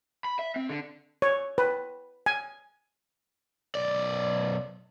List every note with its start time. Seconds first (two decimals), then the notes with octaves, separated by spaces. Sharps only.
0.24 B5
0.39 E5
0.56 C4
0.69 D3
1.22 C#5
1.58 B4
2.26 G#5
3.75 B1 D5